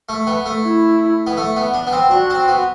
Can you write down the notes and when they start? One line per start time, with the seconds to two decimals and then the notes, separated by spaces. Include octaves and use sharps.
0.09 A3
0.27 B3
0.46 A3
0.64 E4
1.27 B3
1.37 A3
1.56 B3
1.74 D4
1.87 B3
1.93 C4
2.11 D4 F#4
2.30 C4
2.48 B3